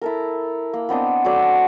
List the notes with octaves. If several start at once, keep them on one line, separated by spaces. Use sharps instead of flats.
E4 A4 A#4
A#3
B3 C4 D4 D#5
F#3 D4 A4 D5